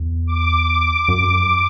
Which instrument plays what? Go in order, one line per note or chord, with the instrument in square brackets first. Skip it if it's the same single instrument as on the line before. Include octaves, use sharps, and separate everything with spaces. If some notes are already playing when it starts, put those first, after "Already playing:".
Already playing: [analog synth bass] E2
[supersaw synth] D6
[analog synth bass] F#2